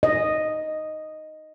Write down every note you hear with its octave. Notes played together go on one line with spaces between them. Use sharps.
D#5